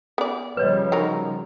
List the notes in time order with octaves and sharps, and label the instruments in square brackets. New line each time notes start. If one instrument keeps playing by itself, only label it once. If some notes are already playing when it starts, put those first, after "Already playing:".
[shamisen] B3 D5
[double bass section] C#3 F3 G3 [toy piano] B4 C#5 D#5
[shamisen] F#3 D#4 A#4